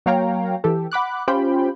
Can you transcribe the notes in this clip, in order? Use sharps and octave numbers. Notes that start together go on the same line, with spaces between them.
F#3 A#3 C#5 F5 G5 A#5
E3 G4 A4
F#5 B5 D6 F#6
C#4 F4 G4 C5 G5 B5